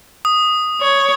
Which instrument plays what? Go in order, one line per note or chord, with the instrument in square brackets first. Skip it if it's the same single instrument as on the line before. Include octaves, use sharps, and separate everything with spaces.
[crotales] D#6
[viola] C#5